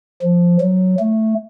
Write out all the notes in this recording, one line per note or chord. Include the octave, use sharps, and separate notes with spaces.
F3
F#3
A3